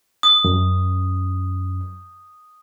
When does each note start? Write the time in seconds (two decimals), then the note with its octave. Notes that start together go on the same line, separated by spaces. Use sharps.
0.23 D#6
0.44 F#2